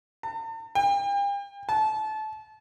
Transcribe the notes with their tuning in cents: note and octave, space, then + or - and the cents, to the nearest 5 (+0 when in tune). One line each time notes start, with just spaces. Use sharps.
A5 +45
G5 +40
A5 -25